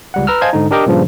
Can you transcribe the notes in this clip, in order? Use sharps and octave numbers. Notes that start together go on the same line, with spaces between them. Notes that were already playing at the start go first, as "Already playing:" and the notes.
C#2 G3 F#5
B4 A#5 E6 F6
C5 D#5 F5 G#5 A5 G#6
G#2 D3 D#4
D4 G4 A#4 D#5 G5 D6
G2 A#2 C#3 F3